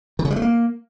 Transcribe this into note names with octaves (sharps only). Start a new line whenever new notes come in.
D#3
C#3
G3
A3
A#3